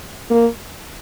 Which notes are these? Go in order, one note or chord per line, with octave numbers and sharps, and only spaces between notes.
A#3